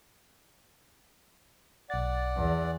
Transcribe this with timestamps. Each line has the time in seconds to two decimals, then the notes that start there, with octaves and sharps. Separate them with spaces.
1.90 B1 D5 F#5 A6
2.36 E2